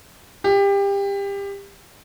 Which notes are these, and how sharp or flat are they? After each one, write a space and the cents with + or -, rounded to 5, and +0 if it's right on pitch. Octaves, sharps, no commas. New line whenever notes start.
G4 +25